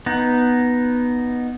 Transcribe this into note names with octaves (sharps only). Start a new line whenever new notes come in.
B3 D#4